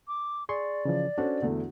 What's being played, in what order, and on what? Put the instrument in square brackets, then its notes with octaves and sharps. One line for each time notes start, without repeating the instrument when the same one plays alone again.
[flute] D6
[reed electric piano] G#4 C6 C#6 [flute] D5
[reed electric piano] C#3 E3 F3
[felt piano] C#4 A4 C5 [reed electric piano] D4 F#4
[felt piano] E2 D3 A3